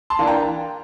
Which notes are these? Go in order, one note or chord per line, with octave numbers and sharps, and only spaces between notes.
A5 C6
E3 A#3 D4 F4
G5 A#5